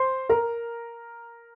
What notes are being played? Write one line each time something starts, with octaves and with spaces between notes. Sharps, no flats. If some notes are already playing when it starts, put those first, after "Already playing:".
Already playing: C5 C6
A#4 A#5